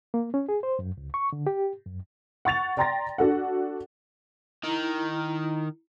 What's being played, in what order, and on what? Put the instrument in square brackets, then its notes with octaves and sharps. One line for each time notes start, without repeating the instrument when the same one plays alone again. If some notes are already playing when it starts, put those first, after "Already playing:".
[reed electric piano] A#3
C#4
G#4
C5
F#2
C#2
C#6
D3
G4
F#2
[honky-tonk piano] F#5 C#6 A6 F7
D5 G5 A#5 C6 A6 A#6
D4 F#4 A4 F#5
[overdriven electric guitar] D#3 [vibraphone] E4 A#5